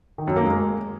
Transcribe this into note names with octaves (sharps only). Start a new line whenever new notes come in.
D#3
F#2
A#3
G#3